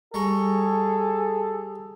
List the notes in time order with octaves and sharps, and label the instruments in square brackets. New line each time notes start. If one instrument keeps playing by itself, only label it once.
[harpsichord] G3 A#5 C#6 [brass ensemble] G#4 A4